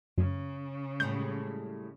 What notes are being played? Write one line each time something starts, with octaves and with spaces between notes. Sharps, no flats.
F#2 C#3
A2 G3 G#3 G6